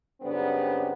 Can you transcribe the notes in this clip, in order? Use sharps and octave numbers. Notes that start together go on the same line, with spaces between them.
F#2 C#3 G3 B3 C4 D4